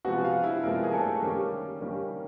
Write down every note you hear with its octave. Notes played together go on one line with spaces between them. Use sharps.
C3 F3 G#3 B3 F#4 F#5
F4 F5
E4 E5
C3 F3 G#3 A#3 B3 A#4
G#4
A3 A4
D#3 G3 A#3 C#4 G4
D#3 G3 A#3 C#4